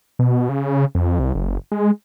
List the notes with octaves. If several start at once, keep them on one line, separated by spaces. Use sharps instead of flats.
B2
C#3
F2
C2
F#1
G#3